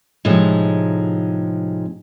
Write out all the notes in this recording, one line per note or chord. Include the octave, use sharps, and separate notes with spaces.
A2 C3 F3 G#3 D#4